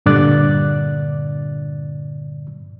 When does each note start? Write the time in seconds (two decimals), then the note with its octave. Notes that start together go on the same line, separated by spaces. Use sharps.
0.06 G2 A#2 D3 D5 F#6 A6